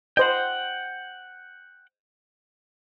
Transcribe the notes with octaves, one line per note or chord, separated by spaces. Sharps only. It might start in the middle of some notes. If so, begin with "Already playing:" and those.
C5 D#5 F#5 G5